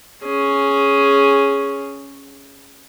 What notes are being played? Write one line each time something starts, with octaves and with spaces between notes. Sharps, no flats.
C#4 G#4